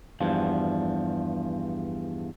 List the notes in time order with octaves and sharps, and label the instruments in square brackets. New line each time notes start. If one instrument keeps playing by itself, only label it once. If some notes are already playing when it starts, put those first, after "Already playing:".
[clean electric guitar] E2 G2 F3